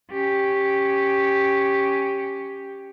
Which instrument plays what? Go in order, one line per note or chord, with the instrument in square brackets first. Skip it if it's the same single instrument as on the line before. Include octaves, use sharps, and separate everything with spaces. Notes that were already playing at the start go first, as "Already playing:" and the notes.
[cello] C#4 G4